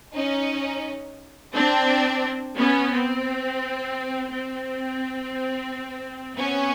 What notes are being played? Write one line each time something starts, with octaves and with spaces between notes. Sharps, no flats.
C#4 D#4
C4 D4
B3 C#4
C4
C4
B3 C#4